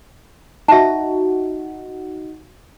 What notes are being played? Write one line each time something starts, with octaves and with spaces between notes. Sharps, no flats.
D#4 F#4 E5 A5